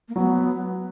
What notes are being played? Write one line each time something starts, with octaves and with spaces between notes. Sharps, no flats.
A#3
F#3 B3